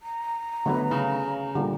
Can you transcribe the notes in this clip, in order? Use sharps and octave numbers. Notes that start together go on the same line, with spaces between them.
A#5
D3 F#3 A3 B3 B4
C#3
A#2 D3 G3